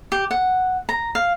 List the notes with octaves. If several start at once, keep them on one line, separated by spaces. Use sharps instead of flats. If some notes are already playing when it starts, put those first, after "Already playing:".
G4
F#5
A#5
F5